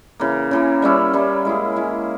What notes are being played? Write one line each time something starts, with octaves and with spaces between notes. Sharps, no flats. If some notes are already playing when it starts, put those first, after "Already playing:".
C#3 E3 A#3
C#3 E3 A#3
G3 A#3 C#4 E4
G3 A#3 C#4 E4
G#3 E4 G#4
G#3 E4 G#4